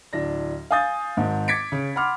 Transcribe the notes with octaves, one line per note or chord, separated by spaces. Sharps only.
D1 D4 A#6
F5 G#5 D#6 G6 A6
G#1 G#2
D6 G#6 A6 B6 C#7 D7
C#3
F#5 B5 C6 D6 F6